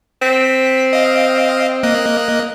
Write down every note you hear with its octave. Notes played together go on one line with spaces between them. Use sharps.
C4 B6
D#5 F5
A#3 D#5 F#6